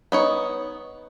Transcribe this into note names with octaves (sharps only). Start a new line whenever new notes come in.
B3 D#4 C#5